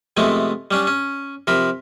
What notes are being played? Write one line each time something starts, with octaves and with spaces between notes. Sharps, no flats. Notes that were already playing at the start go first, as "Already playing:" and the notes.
C3 F3 G#3 A3 B3
G3 C#4 D4
C#4
C3 F3 A#4 B5